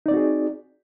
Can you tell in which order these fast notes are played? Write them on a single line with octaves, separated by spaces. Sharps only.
D#4 D5 C4 F#4 G#4